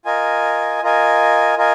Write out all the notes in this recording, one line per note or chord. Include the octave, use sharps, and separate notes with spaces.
F4 A#4 D#5 G#5
F4 A#4 D#5 G#5
F4 A#4 D#5 G#5